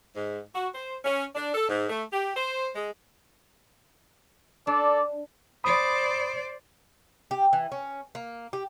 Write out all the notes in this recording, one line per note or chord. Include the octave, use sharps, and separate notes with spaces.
G#2
F#4
C5
C#4
D4
A4
G#2
A3
G4
C5
G#3
D4 A4 D5
C5 D5 B5 D#6
G4
E3
C#4
A#3
G4